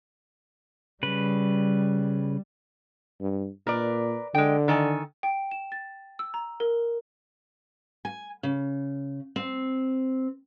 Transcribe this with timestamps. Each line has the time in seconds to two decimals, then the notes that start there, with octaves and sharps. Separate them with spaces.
1.03 C#3 G3 B4
3.21 G2
3.67 A#2 A#4 B4 D5
4.34 D3 G#3 G5
4.68 D#3 A4 G#5
5.23 G5
5.51 E7
5.72 A6
6.19 E6
6.34 A#5
6.60 A#4
8.05 G#5
8.43 C#3
9.36 C4